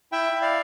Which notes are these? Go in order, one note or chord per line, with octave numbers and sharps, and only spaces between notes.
E4 E5 G5
E4
D5 F5